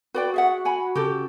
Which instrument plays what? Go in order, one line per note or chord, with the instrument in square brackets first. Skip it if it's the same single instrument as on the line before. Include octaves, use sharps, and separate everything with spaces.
[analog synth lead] F#4 [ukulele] B4 D5 G5
[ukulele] G#4 E5 F#5
F#5 G#5 B5
[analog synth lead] C#3 [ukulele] F#4 G4 A4